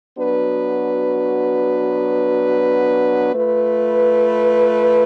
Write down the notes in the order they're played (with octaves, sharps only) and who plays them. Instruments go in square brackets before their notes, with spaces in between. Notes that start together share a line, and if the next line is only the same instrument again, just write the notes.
[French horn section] F#3 B3 D4 F#4 B4
A3 F4 B4